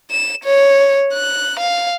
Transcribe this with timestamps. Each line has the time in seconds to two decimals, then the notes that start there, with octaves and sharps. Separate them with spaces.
0.11 E7
0.44 C#5
1.13 F#6
1.60 F5